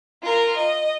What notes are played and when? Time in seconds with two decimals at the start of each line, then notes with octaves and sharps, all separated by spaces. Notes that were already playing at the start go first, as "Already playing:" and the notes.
0.23 F4 A#4
0.56 D#5